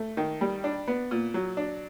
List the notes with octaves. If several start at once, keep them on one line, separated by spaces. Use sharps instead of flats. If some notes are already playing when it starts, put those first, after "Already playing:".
Already playing: A3
D#3
G3
D4
B3
A#2
F#3
D4